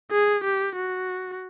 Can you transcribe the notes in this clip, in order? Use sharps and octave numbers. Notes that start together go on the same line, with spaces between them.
G#4
G4
F#4